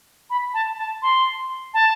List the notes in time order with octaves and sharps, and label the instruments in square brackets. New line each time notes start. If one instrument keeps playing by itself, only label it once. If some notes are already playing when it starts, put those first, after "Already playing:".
[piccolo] B5
A5
A5
C6
A5